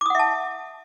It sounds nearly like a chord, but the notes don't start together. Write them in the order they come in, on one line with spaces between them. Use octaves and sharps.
D6 D#6 F#5 E5 A5